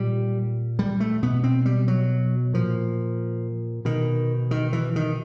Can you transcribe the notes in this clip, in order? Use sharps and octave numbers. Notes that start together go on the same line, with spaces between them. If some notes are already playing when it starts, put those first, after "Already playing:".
Already playing: A#2 G3
G3
A3
B2 B3
C4
G3
F#3
A#2 F3
B2 D#3
D#3
E3
D#3